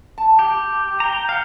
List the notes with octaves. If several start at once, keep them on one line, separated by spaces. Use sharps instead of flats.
A5
G4
G5 A#5
F5 F#5